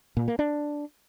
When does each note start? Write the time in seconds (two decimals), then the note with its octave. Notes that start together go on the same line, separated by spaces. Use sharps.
0.17 A#2
0.28 A#3
0.39 D4